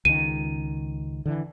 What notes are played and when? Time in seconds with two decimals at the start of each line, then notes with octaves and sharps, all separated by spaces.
0.05 C#2 D#3 D#7
1.26 D3 E3